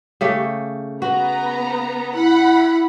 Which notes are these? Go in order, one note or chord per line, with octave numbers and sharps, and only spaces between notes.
C#3 A3 G4
B3 F#4 A#5
E4 F#5 B5